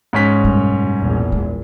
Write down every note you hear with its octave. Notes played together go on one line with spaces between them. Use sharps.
G#2 C#4 B6
F#2 B2 G3
A#1 E2
G#3